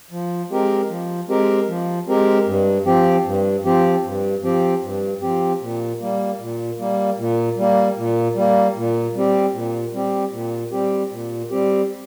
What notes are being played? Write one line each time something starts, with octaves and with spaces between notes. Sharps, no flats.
F3
G#3 C4 G4 A#4
F3
G#3 C4 G4 A#4
F3
G#3 C4 G4 A#4
G2
F3 C4 G4
G2
F3 C4 G4
G2
F3 C4 G4
G2
F3 C4 G4
A#2
G3 A#3
A#2
G3 A#3
A#2
G3 A#3
A#2
G3 A#3
A#2
G3 C4 G4
A#2
G3 C4 G4
A#2
G3 C4 G4
A#2
G3 C4 G4